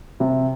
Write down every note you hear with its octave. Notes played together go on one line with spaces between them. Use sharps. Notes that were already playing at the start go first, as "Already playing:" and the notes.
C3